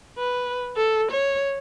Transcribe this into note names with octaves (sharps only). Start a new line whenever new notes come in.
B4
A4
C#5